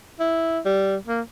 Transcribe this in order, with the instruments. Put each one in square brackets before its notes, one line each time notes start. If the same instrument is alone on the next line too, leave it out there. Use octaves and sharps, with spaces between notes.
[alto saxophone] E4
G3
A#3